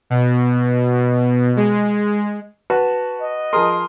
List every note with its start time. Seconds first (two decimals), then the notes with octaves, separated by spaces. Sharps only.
0.10 B2
1.57 G#3
2.70 F#4 B4 A5
3.21 D#5
3.53 F3 G#4 A#4 C6 D#6